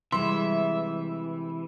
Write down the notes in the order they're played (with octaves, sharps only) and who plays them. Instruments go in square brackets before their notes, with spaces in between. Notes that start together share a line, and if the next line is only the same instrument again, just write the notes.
[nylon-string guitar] C3 G3 G#3 [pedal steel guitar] E3 [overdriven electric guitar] E5 [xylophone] C6